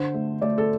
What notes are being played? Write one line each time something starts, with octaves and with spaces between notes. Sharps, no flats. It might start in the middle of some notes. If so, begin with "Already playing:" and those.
Already playing: D3 C5
A3
A3 D5
A4